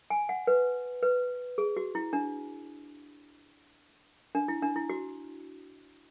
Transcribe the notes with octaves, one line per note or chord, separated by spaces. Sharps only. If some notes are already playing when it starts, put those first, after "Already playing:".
G#5
F#5
B4
B4
G#4
F#4
E4
D4
D4
E4
D4
E4
F#4